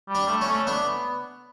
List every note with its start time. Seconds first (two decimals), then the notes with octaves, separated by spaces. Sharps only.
0.08 G3
0.15 D4
0.28 A3
0.41 C#4
0.48 A3
0.67 B3 D4